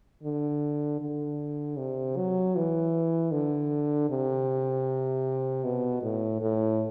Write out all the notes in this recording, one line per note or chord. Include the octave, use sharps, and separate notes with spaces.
D3
D3
C3
F#3
E3
D3
C3
B2
A2
A2